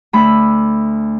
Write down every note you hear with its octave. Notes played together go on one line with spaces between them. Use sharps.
D2 A3 B5 D6 E6